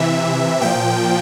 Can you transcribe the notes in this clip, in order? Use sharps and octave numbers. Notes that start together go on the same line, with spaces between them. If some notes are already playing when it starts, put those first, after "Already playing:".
Already playing: C3 E3 E5
A#2 F3 G5